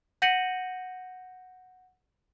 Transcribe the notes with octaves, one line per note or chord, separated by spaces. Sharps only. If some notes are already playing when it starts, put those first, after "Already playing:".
F#5 G6 A#6 C#7 D#7 F#7